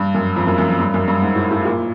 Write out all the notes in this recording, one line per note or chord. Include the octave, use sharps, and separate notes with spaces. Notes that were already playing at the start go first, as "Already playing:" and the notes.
Already playing: G2
F#2
F2
F#2
F#2
F2
G2
F#2
G2
G#2
A2
A2
A#2